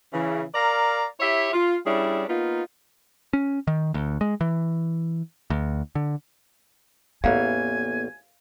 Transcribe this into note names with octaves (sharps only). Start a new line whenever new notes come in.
C#3 E3
A#4 D5 F5 A#5
E4 G4 C#5 E5
F4
G3 C#4 D4 E4 G#4
A#3 B3 D#4 F4
C#4
D#3
D2
G#3
E3
D2
D3
A1 E2 A#3 B3 F5 G#5 A#5